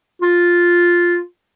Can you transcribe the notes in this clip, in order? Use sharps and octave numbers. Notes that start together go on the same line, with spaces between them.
F4